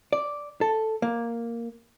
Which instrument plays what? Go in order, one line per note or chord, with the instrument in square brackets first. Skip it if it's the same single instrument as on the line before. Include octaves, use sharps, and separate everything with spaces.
[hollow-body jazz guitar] D5
A4
A#3